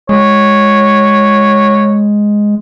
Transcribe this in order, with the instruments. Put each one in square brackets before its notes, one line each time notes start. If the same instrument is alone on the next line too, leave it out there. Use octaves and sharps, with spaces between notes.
[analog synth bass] G#3 [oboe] C#5